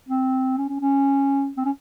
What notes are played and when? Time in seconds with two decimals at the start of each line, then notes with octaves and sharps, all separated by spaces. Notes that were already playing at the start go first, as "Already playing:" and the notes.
0.09 C4
0.58 C#4
0.69 C#4
0.81 C#4
1.57 C4
1.65 C#4